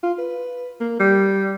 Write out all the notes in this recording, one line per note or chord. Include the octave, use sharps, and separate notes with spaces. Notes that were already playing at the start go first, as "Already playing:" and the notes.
F4
B4
A#3
G3